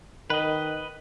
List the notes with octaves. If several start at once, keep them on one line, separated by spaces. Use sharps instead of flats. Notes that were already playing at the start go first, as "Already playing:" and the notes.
D#3 B4 D#5